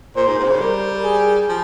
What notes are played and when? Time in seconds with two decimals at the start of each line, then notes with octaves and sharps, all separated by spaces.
0.16 A#2 C5
0.27 G#2
0.39 G#2
0.44 C3
0.50 C#3
0.60 G3 A#4
1.04 G#4
1.49 F3